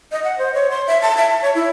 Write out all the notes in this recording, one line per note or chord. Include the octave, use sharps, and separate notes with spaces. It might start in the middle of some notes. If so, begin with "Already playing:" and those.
D#5
F#5
C5
C#5
C6
E5
A5
E5
A5
C#5
E4